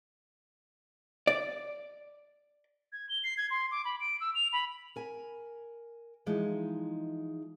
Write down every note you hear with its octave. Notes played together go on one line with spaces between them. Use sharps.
D5
G#6
G7
C7
G#6
C6
D6
B5
D7
E6
F7
B5
A#4 G#5
E3 F3 G#3 D#4